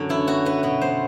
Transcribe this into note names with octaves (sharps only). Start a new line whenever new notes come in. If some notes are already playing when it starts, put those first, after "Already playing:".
Already playing: F#2 D3 C#4
B3 E4
B3 F#4
B3 B4
B2 B4
B3 C5